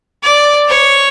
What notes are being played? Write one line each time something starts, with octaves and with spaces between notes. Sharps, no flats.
D5
C#5